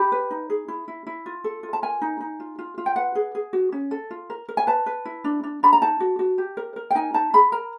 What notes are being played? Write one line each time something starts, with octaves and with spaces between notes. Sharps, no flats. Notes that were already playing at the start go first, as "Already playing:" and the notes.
Already playing: G4 B5
B4
D#4
G#4
E4
E4
E4
F4
A4
F4
A5
A#4 G#5
D#4
D#4
F4
F4
F4
G5
B4 F#5
G#4
G#4
F#4
C#4
A4
F4
A#4
A#4
G#5
B4 A5
B4
E4
D4
D4
D4 B5
A#5
D#4 A5
F#4
F#4
G4
A#4
A#4
G5
D#4 G#5
D#4 A5
G#4 B5
A#4 A#5